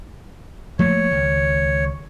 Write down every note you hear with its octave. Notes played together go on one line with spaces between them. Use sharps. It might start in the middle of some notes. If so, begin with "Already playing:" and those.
F3 A3 A#3 C#5
C#2 D#3